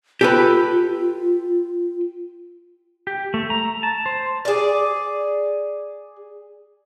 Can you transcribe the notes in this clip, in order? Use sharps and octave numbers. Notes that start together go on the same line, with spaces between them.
F4 G4 A4 B4
G4
A3
A#5
A5
C5
G#4 D5